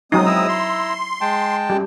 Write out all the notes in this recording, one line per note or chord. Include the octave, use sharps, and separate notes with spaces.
F#3 G#3 C4 D#4 D#6
E4 A#5 E6
C6
G#3 G5 A5
F#2 G3